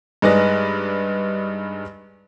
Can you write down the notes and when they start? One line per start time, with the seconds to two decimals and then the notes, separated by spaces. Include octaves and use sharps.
0.22 G2 G#3 D#4 B4 D5 A#6